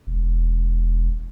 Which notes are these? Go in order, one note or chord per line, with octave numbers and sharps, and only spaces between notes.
E1